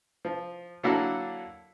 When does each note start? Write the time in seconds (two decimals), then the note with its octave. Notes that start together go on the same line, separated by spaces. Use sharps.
0.25 F3
0.83 D3 F#3 A#3 E4 F#4 A4